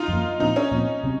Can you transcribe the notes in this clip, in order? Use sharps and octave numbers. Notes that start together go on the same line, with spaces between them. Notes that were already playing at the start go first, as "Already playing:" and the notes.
Already playing: D#4 F4
F#2 F3 A#3
A#2 F3 C4 D#4
C#4
A#2 F3 C4
C3 F#3